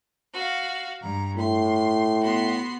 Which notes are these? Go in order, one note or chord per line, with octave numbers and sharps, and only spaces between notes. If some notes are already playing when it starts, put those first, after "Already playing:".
F#4 F5
G2 A#5
A2 C6
B3 F#4 C6